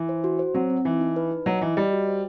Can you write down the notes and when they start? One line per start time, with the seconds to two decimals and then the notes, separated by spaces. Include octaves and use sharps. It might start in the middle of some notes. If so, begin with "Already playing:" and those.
Already playing: E3
0.09 C5
0.24 F#4
0.39 C5
0.54 F#3 C4
0.70 C4
0.85 E3 D#4
1.01 D#4
1.16 B4
1.31 D#4
1.46 F#3 D#5
1.61 E3 D#5
1.77 G3 D#5
1.93 F#4
2.08 C5